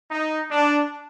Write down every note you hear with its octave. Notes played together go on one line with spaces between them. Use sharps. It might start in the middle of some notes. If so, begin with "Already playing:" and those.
D#4
D4